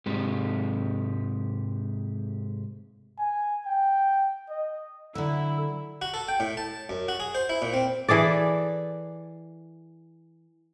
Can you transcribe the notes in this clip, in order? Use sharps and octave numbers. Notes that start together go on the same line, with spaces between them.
G#2 C3 G#3 G4
G#5
G5
D#5
D3 F#3 E4 A4
F#4
A4
G5
A2
A5
F#2
F#4
G#4
C5
E4
A#2
C4
E3 G#4 A4 D5